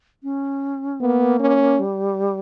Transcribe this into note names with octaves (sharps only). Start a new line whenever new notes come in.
C#4
A#3 B3
C#4
G3